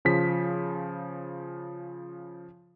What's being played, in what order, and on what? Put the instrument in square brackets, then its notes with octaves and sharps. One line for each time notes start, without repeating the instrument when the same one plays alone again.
[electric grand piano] C#3 F3 B6